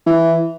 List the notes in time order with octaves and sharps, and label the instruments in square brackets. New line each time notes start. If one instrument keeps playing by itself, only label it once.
[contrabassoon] E3